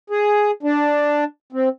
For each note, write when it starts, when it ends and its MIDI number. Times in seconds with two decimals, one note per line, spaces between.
0.10 0.51 68
0.63 1.24 62
1.53 1.69 60